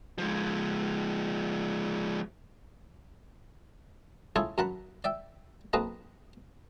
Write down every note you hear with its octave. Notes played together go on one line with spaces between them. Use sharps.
F3 G#3
E4 F4 G#4 A4 C#5
F#2 A#4 F#5 A5 B5
D5 E5 G5
B1 A#3 C4 B4 D#5 A5